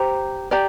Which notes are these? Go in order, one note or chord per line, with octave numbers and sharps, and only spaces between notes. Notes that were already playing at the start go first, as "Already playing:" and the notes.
Already playing: G4 C5 A#5
G4 D5 A#5